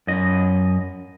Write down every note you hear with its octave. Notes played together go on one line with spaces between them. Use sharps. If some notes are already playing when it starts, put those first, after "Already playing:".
F#2 D#5